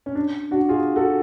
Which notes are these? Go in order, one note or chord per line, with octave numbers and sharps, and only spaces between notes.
C#4
D4
D4 F#4
F4 G#4
F#4 A4